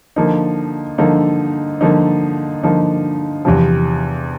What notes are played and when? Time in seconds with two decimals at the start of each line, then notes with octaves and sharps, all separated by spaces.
0.16 D3 F3 A#3 D#4
0.98 D3 F3 A#3 D#4
1.81 D3 F3 A#3 D#4
2.63 D3 F3 A#3 D#4
3.45 E2 C3 F3